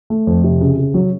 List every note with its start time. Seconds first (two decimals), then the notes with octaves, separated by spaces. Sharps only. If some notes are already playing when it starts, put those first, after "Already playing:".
0.10 A3
0.27 F2
0.44 C3
0.61 C#3
0.78 C#3
0.94 F#3